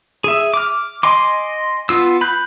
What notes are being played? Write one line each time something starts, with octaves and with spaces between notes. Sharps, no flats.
G#4 E5
D6 F6
D#5 G#5 C6 D6
B3 F4 E6
B5 F#6 G6